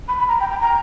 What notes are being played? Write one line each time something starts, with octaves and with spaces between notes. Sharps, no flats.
B5
B5
A#5
G5
G5
A#5